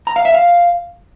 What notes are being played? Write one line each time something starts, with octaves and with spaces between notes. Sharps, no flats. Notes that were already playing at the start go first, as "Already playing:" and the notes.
A#5
F5
E5
F5